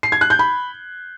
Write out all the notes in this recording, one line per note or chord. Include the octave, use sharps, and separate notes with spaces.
C7
G#6
F#6
G6
B5